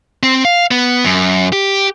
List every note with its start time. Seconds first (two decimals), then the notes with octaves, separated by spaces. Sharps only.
0.23 C4
0.45 F5
0.71 B3
1.04 F#2
1.52 G4